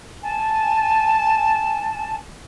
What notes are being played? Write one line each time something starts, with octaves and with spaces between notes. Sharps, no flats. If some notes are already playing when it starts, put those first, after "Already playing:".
G#5 A5